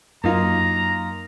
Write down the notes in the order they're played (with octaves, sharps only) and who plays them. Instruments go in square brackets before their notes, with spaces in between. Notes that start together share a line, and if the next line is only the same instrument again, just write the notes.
[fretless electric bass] F#2 [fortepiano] A#3 D#4 F4 [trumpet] A#5